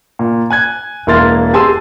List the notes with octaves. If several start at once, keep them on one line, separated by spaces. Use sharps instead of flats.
A#2
G#5 F#6 G#6
E1 A#3 E4 C6 F6 A6
G4 G#4 G#5 A5 C6 E6